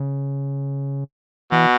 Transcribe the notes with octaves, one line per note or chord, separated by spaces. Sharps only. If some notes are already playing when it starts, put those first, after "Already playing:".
Already playing: C#3
B2 E3